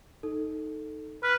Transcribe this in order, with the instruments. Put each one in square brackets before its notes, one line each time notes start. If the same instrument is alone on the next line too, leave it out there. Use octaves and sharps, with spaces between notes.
[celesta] D#4 A4
[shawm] B4 [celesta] F6